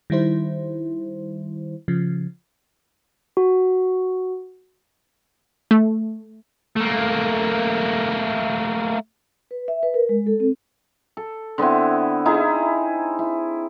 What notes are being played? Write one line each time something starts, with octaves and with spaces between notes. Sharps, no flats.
D#3 G3 E4 C5
C#3 F3
F#4
A3
A3 A#3
B4
E5
B4
A#4
G#3
A4
C4
A4
D3 B3 C4 E4
D#4 E4 G#4 A#5
E4